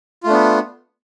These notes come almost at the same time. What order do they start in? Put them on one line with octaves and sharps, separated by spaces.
F4 A3 D4 B3